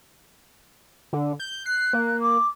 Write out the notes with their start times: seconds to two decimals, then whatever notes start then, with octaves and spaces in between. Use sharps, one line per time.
1.13 D3
1.40 G6
1.66 F#6 C7
1.93 A#3
2.20 D6